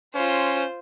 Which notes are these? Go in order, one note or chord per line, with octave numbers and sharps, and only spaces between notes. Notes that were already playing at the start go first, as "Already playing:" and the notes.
C#4 F4 C5